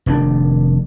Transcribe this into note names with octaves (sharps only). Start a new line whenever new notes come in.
F1 D#3 D4